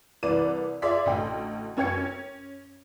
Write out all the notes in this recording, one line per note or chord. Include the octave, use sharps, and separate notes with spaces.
C2 E3 B4 D5 D#7
F4 G#4 D5 E5 C6 B6
A1 D2 G5
F#2 C#4 C#5 G5 G#6 C#7
C#4